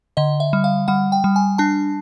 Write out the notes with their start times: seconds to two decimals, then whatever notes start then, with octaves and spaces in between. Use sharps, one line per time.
0.17 D3 D#5
0.40 E5
0.53 G3
0.64 F5
0.88 G3 F#5
1.12 G5
1.24 G3
1.36 G#5
1.58 D4 A5